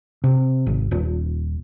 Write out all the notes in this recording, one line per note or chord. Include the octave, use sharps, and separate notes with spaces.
C3
G#1
D#1